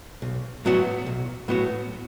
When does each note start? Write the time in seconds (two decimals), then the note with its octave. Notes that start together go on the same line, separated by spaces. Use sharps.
0.22 B1
0.65 A2 F#3 B3 F#4
1.06 B1
1.48 A2 F#3 B3 F#4